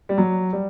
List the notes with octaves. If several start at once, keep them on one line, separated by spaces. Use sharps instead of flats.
G3
F#3
G3